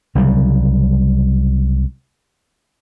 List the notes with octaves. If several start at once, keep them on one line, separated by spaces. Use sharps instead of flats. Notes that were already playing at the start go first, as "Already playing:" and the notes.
C2 C#3 F#3 G3